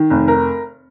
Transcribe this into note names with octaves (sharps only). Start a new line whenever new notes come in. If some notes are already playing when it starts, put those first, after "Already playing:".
Already playing: D#3
F1
A#4